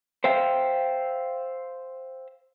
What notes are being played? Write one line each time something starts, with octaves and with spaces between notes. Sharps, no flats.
C5 E5 F5 G5